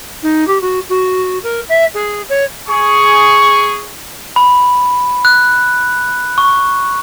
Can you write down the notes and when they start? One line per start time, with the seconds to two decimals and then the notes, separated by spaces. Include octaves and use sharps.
0.23 D#4
0.47 G4
0.61 F#4
0.89 F#4
1.43 A#4
1.69 E5
1.94 G#4
2.29 C#5
2.68 G#4 C#6
4.36 B5
5.25 F#6
6.38 C#6